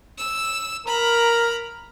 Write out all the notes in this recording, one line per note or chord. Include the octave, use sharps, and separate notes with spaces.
E6
A#4 A#5 B5